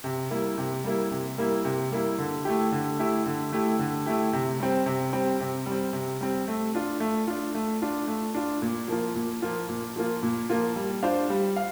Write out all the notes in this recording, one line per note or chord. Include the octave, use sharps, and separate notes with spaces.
C3
G3 A#3 E4
C3
G3 A#3 E4
C3
G3 A#3 E4
C3
G3 A#3 E4
D3
A3 E4 G4
D3
A3 E4 G4
D3
A3 E4 G4
D3
A3 E4 G4
C3
G3 C4
C3
G3 C4
C3
G3
C4
C3
G3 C4
A3
D4 F4
A3
D4 F4
A3
D4 F4
A3
D4 F4
A#2
F3 A#3 F4
A#2
F3 A#3 F4
A#2
F3 A#3 F4
A#2
F3 A#3 F4
G3
D4 F4 C5 F5
G3
F5